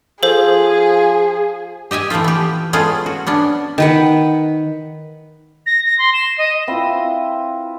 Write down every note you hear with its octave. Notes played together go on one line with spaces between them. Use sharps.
F3 G#4 A4 C5
G4 D#5 E5 G#5
E3 F3 A3 C4 F4
B3 G4
G#3 A3 B3 C#4 F4 G#4
F#4
B3 C#4 D4
D#3 B4 F#5
A#6
A#6
C6
E7
D#5
C4 E4 F4 B4